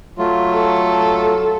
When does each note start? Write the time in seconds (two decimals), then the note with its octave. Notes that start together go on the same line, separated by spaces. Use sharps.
0.18 F#3 A3 F4
0.52 A4